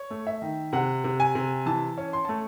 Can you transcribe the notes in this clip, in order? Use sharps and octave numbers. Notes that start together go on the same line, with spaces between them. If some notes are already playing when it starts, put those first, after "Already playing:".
Already playing: C#5
A3
E5
D#3
C3 F#5
C3
G#5
C3
E3 A5
C#4
C6
A3 A5